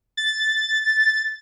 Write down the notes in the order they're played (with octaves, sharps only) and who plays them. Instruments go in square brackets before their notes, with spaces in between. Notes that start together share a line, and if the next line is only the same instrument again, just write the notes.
[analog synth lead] A6